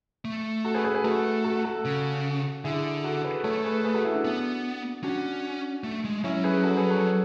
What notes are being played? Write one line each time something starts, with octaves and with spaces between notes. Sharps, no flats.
A3
F#4 A4
G#4 B4
G#4 B4
G#4 B4
A3 F#4 A4
F#4 A4
F#4 A4
C#3
D3 E4 G#4
F#4 A4
G#4 B4
A3 A4 C#5
G#4 B4
G#4 B4
F#4 A4
E4 G#4
D4 F#4
B3
C#4 D4 F#4
A3
G#3
F#3 C#4 E4
G#4 B4
F#4 A4
G#4 B4
A4 C#5